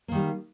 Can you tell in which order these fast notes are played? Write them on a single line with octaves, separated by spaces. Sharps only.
A#3 D#3 G3